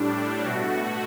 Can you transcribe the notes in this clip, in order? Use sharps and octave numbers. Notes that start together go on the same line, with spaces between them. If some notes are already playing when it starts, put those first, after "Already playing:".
Already playing: A2 G3 D4
B2 A3 F#4